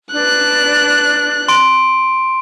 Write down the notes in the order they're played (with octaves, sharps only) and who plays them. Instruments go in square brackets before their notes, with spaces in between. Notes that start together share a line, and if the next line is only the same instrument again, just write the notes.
[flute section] D4 B4 [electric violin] F#6
[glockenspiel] C6 D7